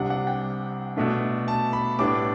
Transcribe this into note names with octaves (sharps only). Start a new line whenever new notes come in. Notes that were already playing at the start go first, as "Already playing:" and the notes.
Already playing: C2 C3 G3 D4 F#5
F#5
G5
B2 A3 D4
A5
B5
A2 G3 B3 D4 D6